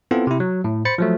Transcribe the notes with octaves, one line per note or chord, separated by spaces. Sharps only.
B3 C4 E4 F4 A4
C3 E4
F#3
A2
C5 B5 A6 C#7
F3 F#3 A3